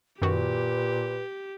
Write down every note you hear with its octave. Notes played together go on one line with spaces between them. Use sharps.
F#2 A#2 D#3 F#4 G4 B4